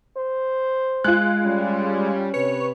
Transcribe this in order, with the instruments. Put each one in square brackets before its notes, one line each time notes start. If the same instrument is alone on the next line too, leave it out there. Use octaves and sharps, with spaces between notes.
[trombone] C5
[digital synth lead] G#3 [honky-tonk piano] F4 F#6
[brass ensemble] G3 [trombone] C#4
[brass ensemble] C3 B4 [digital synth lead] C#5